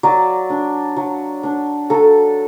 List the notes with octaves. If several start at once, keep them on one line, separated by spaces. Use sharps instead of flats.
F#3 D5
D4
F#3
D4
F#3 A4